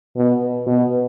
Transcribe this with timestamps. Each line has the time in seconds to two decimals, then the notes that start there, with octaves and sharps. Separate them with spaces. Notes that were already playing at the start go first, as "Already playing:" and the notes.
0.17 B2
0.66 B2